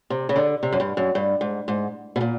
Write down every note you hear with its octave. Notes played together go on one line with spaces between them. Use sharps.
C3
C#3
D3
C3
F#2
G2
F#2
G2
G#2
G#2
B2
A#2